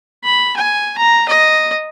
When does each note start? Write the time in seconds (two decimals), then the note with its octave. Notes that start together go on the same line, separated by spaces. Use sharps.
0.24 B5
0.56 G#5
0.98 A#5
1.28 D#5